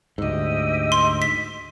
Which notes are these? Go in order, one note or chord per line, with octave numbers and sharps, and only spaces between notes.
D2 G#2 G4 D#5 E6
C6
B6